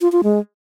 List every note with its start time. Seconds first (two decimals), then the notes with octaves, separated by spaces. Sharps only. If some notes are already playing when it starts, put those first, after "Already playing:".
0.01 F4
0.12 F4
0.24 G#3